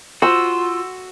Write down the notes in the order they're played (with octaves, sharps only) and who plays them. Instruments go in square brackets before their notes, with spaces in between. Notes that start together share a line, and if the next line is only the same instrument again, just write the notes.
[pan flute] F4 [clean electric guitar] F#4 [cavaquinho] C5 [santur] E6